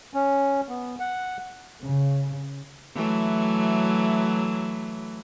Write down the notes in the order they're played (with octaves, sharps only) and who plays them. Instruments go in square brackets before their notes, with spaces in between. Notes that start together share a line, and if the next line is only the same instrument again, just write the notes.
[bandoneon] C#4
B3
F#5
[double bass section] C#3
[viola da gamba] E3 F#3 A3